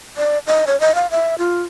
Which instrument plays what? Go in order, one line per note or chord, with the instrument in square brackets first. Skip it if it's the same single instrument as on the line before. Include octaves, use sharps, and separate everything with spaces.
[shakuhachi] D5
D#5
C#5
D#5
F5
E5
F4